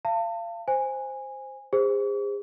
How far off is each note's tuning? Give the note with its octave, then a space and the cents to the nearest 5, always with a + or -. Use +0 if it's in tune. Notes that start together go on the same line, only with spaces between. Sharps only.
F5 -30 A5 +30
C5 +0 G#5 -15
G#4 -40 C5 +0